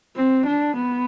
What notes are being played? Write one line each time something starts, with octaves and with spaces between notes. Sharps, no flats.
C4
D4
B3